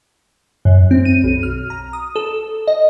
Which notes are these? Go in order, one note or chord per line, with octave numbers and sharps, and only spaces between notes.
F#2
C4
D#7
B1
F6
A#5
D#6
A4
D#5